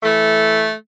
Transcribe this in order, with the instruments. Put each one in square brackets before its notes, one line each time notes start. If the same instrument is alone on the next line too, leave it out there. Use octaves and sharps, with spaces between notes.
[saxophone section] E3 A3